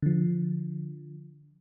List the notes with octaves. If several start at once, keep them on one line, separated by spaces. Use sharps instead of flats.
D3 F3